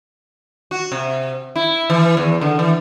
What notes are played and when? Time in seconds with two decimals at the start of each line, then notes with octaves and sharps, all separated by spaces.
0.71 F#4
0.92 C3
1.56 E4
1.90 E3
2.17 E2
2.41 D3
2.59 E3